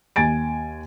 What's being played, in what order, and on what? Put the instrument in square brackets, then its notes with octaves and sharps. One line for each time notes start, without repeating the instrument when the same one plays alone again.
[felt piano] D#2 G#5 A6 D7